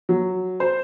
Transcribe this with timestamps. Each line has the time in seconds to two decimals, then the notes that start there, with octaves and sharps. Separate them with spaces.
0.09 F#3
0.60 C5